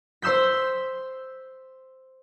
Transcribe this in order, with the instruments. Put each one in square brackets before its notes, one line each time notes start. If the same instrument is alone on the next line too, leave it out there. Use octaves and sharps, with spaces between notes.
[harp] C5 C6 E6 G6 B6